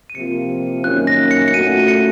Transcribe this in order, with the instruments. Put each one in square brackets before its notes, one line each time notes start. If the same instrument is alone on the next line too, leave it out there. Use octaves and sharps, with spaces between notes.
[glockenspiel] D#7
[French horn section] C3 F3 A#3 F4 [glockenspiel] C#7
[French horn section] F#2 D#3 A#3 C#4 [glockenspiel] F#6
[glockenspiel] A#6
C#7
C#7
[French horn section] A#2 A3 C#4 F#4 [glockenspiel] D#7
[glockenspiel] D#7
C#7